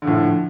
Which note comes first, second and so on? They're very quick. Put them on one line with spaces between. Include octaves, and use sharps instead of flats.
D3 F3 A2